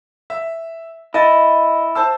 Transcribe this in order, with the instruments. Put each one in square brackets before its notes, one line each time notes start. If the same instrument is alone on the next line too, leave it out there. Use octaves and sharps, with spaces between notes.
[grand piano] E5
[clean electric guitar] E4 [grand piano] D#5 A6
[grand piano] C5 A5 E6